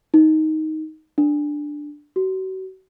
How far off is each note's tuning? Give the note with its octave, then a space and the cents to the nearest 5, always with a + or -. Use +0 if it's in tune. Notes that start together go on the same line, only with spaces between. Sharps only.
D#4 +10
D4 +5
F#4 +35